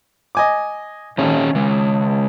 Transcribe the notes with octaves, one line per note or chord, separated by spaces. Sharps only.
D#5 G#5 D6
G#1 A#2 C#4
C#3 G#3